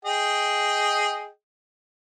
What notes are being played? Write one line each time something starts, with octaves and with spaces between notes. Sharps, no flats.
G#4 D#5 G5